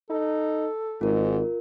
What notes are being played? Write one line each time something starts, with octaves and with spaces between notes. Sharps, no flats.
D#4 A4
G#1 G#2 F4 A#4